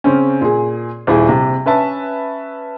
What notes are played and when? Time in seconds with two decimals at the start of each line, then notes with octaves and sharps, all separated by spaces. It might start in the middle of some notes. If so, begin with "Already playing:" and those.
0.04 C#3 C4 C#4
0.42 A#2 G#4
1.07 D#1 E4 G#4
1.29 C3
1.66 C#4 B4 E5 A5